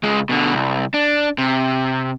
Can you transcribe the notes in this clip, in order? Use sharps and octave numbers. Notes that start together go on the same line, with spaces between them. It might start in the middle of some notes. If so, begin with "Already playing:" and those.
C#2 G#3
B2 D3
C2
D4
C3